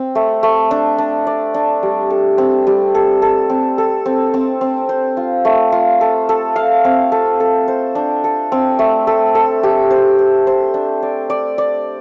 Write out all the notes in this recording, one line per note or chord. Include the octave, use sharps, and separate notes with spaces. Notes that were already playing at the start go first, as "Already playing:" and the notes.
Already playing: C4
A3
A3
D4
D4
D5
D4
G3
A4
C4
G3
A4
A4
C4
A4
C4
C4
C4
C5
F4
A3
F4
A4
A4
F5
C4
A4
A4
C5
D4
A4
C4
A3
A4
A4
G4
C5
C5
C5
D4
D5
D5
D5